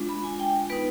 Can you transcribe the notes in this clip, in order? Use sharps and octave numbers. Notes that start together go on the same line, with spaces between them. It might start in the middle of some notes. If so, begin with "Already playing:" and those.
Already playing: G#3 D4 F4
B5
G#5
G5
B3 D#4 B4